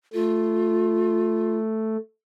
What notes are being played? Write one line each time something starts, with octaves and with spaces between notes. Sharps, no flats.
A3 F4